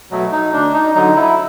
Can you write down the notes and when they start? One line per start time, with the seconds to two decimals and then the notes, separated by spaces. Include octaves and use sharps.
0.11 B2 F#3 A3
0.31 D#4
0.52 D2 D4
0.74 D#4
0.95 D3 F#3 D#4
1.16 E4